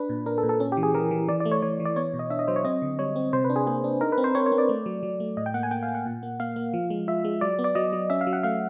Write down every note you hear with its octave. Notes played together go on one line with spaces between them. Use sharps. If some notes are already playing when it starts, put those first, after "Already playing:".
Already playing: D4 B4
A#2
D4 A#4
A4
A#2
A4
C#4
G4
E3
G#4
E3 A#4
E3
E3 D5
D5
A3
C#5
E3 C#5
E3
D5
B3 C#5
B2
D#5
D4 E5
D#5
F#3 C5
C#5
C4 D#5
D3
G3 C#5
C4
C3 C5
B4
D4
G#4
A#3 G#4
D4
D#4 A#4
B4
C4
C5
C4 C#5
C#5
C4
D5
A3
F#3
F#3
A3
A2 D#5
G5
A#3 F#5
G#5
A#3 G5
F5
A#3
F#5
A#2
A#3
A#3 F5
A#3
F3
G#3
F4 E5
G#3
F#3 D5
B3
D5
F#3 D#5
F#3
C#4 E5
F5
F#3
F#5
A3 F5